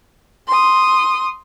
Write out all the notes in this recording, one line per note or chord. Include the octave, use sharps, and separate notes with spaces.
C6 D#6